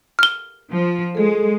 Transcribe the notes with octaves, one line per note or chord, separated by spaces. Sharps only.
F6 G7
F3
G#3 G#4 A4